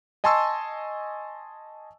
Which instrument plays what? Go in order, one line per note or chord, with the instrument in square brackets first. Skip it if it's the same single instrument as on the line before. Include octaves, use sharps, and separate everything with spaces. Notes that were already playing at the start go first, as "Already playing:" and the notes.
[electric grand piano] D#5 G#5 A5 C6 C#6 E6